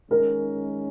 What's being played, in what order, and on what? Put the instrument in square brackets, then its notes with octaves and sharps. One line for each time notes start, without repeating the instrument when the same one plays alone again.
[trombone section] D#3 G#3 C#4 [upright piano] A#4